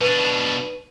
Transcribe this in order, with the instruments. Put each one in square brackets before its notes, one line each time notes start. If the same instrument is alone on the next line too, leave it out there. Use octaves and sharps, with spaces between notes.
[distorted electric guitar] B2 D4 [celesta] B4 D#7